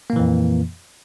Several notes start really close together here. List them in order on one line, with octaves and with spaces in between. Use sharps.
A#3 A#2 E3 F2